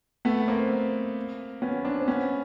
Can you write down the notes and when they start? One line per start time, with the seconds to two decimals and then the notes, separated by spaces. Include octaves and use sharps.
0.25 A3 B3
0.48 A#3 C4
1.62 B3 C#4
1.85 C4 D4
2.01 C4
2.07 B3 C#4